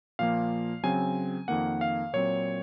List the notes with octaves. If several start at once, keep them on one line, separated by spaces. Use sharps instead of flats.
A#2 F3 A#3 F5
C#3 F#3 C4 G#5
F2 D#3 A#3 F#5
F5
A#2 F#3 C4 C#5